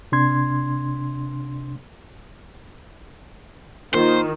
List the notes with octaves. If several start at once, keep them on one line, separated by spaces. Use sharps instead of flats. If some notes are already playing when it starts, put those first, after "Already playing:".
C3 D4 C6 G#6
D#3 A#3 F4 C5